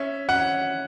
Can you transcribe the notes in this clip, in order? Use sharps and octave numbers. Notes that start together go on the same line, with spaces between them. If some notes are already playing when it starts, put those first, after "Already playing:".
Already playing: C#4 E5
C#4 F#5